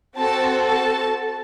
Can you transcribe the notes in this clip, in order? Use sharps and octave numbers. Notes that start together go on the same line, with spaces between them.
C4 F#4 A4 A5
A5